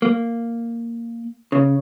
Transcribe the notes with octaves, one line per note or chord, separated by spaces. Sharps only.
A#3
C#3